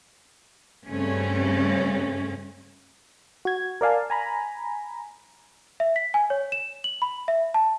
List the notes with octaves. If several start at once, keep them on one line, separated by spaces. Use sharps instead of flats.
G2 C#3 G3 A3 C4 C#4
F#4 G#6
A#4 D5 F5 G#5 A5
G#5 A#5 B5
E5
B6
G#5
C#5
E7
F#7
B5
E5
A5